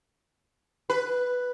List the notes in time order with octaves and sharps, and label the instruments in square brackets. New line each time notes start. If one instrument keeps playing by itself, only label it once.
[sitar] B4